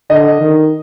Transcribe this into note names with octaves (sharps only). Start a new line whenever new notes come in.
D3 D#5
D#3